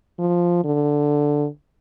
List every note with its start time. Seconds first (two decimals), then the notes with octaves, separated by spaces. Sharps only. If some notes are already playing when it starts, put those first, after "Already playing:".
0.19 F3
0.64 D3